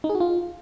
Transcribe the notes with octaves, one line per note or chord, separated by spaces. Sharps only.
D#4
G#4
F#4
F4